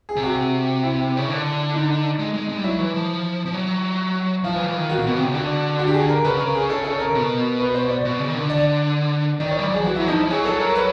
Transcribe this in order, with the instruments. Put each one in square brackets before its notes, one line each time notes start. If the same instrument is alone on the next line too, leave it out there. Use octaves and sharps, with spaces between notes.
[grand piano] G#4
[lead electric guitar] C3
[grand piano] F#4
E4
[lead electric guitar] C#3
D3
[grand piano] D#4
[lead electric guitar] G#3
G#3
G#3
G3
[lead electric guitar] F#3 [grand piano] E4
[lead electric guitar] E3
F3
F3
F#3
[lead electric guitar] F3 [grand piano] F4
[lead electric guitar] E3
F3
E3
D#3
[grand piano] F#4
[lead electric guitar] A#2
B2
C3
C#3
[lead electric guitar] D3 [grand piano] F#4
[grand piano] F#4
G4
G#4
A#4
[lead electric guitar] C#3 [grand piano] B4
[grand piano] A#4
G#4
A4
A4
A#4
[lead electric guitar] B2
[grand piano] B4
C5
D5
[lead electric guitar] B2
C#3
D#3
D3
[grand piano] D5
[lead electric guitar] D#3 [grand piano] D5
[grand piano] C#5
[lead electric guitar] G3
[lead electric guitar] F#3 [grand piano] D5
[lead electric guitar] F3 [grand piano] G#4
[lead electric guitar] E3 [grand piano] F#4
[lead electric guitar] F#3 [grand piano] E4
[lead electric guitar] F3 [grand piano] D#4
[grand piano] E4
[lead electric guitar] F#3 [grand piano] G#4
[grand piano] A4
A#4
B4